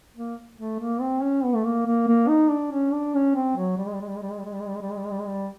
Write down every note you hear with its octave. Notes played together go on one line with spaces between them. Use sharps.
A#3
A3
A#3
C4
C#4
B3
A3
A#3
A#3
A#3
D#4
D4
C#4
D4
C#4
C4
F#3
G3
G#3
G3
G#3
G3
G#3
G3
G#3
G3
G#3
G3
G#3
G3
G#3
G3
G#3
G3
G#3
G3
G#3
G3